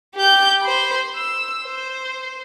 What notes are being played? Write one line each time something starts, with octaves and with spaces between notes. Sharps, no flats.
G4 G6
C5 B5
E6
C5